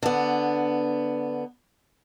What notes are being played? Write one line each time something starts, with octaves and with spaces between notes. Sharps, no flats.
D3 B3